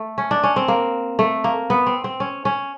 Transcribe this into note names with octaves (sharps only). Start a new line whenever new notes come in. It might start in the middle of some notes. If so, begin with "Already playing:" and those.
Already playing: A3
C#4
D4
C#4
C4
A#3
A3
A#3
B3
C4
C4
C#4
C#4